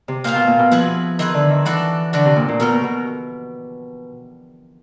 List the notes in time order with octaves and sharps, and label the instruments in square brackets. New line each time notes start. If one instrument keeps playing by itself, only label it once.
[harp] C3
[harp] A#2 [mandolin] F4 G#4 C5 F5
[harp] B2
A#2
B2
[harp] F3 [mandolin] C4 E4 G#4 B4
[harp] D#3 [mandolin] C4 E4 G#4 B4
[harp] D3
D#3
[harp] E3 [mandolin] D4 F#4 A4 D5
[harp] D3 [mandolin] D4 F#4 A4 D5
[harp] C3
A#2
A#2
[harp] B2 [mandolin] A3 C#4 F#4 A#4
[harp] B2